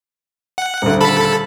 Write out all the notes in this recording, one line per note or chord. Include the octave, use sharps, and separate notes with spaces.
F#5
D#1 D2
A4 A5 B5